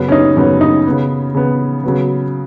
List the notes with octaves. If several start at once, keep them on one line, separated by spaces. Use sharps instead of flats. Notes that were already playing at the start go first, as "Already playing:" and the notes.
Already playing: F#2 C#3 B3
C#4
D#4
F#2 C#3 B3 C#4
D#4
C#3 B3
C#3 B3
C#3 F#3 B3